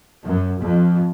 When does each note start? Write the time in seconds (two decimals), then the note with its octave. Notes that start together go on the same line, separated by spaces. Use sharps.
0.25 F#2
0.61 F2